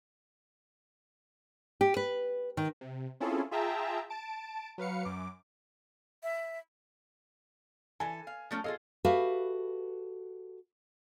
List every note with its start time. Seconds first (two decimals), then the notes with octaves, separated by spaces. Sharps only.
1.81 G4
1.97 B4
2.57 D#3
2.81 C3
3.20 C4 C#4 E4 F4 G#4 A4
3.51 F4 G#4 E5 G5 A5 A#5
4.10 A5 D7
4.78 F#3 B4 F5 C#7
5.05 F#2 D6
6.23 E5
8.00 E3 A4 G#5
8.27 F5
8.51 F3 A3 C#4
8.64 F4 G#4 A4 D#5 F5
9.04 F#4 G4 A4 B4 E5 F5